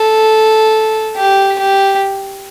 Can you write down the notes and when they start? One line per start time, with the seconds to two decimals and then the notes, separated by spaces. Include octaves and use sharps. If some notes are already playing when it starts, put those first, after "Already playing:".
Already playing: A4
1.17 G4
1.59 G4